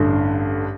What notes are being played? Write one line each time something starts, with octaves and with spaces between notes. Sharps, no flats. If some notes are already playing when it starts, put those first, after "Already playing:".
Already playing: A1 G2 D3